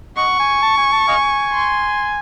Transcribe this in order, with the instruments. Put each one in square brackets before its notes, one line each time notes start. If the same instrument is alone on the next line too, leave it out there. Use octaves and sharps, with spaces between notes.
[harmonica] D#5 F#5 [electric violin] C#6
[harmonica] G#5
A5
G#5
A5
D#5 F5 G#5
[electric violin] C6